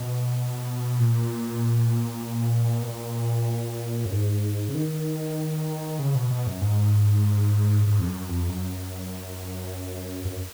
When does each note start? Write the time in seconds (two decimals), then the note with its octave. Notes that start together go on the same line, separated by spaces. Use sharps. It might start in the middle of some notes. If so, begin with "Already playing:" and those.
Already playing: B2
0.99 A#2
2.82 B2
2.87 A#2
4.05 F#2
4.12 G#2
4.68 C#3
4.74 D#3
5.99 C#3
6.15 B2
6.30 B2
6.47 F#2
6.61 G#2
7.87 G#2
8.00 F2
8.08 F#2
8.29 F2
8.49 F#2
10.25 F#2